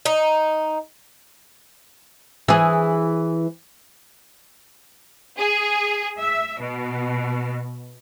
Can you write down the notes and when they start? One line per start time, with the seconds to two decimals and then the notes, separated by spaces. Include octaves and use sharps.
0.05 D#4
2.48 E3 G#4
5.39 G#4
6.19 E5
6.60 B2